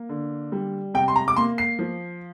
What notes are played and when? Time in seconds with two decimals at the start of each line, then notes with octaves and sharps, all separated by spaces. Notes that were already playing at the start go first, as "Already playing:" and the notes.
Already playing: A#3
0.09 D3
0.52 G3
0.94 C3 G5
1.08 C6
1.16 A#5
1.28 D6
1.36 A#3 C6
1.58 C7
1.79 F3